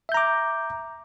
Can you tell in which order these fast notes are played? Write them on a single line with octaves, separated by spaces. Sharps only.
E5 G6 A#5 D6